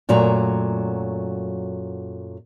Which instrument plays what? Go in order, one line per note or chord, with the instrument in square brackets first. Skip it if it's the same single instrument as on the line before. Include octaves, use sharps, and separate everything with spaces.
[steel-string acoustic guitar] F#2 A#2 F#3 A3 A#5